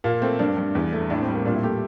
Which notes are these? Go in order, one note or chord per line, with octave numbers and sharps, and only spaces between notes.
A#2 A#3
A3 C4
G2 D4
G2
E2
A3
A2 D4
C4
G3
A#3
A#2 D4
E4
A3 G4